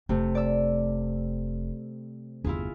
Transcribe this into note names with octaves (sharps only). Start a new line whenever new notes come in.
F1 C3 A3
D5 D6 E6
G1 E2 E4 F4 G#4